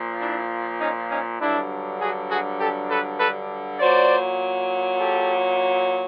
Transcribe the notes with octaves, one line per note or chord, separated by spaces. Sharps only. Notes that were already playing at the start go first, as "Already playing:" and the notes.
Already playing: A#2 F3
D4 E4
C#4 D#4
C#4 D#4
G2 D3 F#3 D4 E4
F#4 G#4
F#4 G#4
G4 A4
A4 B4
A4 B4
A#2 F#3 C5 D5
G4 A4